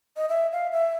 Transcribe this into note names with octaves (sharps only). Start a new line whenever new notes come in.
D#5
E5
F5
E5